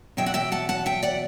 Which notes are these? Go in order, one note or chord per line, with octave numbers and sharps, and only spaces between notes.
E2 B2 F#3 E5 G5
F#5
E5 G5
F#5 A5
F#5 A5
E5 G5
D5 F#5